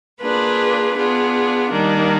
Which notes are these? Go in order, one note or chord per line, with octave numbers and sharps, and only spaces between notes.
A#3 D4 F4 G#4 B4
B3 D4 F4 G#4
D#3 G3 A#3 D4